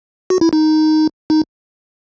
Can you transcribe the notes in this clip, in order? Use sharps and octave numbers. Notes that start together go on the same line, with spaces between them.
F#4
E4
D#4
D#4